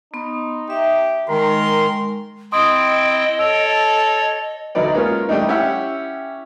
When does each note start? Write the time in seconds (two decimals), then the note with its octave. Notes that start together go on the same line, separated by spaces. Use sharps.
0.14 B3 D#4 C6
0.70 G4 E5
1.29 D#3 G#3 A#4 C6
2.52 C4 E4 D#5 G5 C6 D#6
3.39 A4 C#5 E6 D7
4.75 D2 F#3 D#4 B4 D5
4.93 G#3 A#3 B3 C#4 F4
5.29 G3 A3 D4 D#4
5.48 C#4 E4 G4 E5 F#5